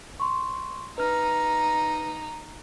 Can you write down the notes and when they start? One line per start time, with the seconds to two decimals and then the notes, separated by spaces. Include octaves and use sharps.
0.20 C6 C#6
0.98 D#4 B4 F6